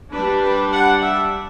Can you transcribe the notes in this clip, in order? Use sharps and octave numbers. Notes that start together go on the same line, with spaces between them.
G3 D4 B4
B4
F#5
E5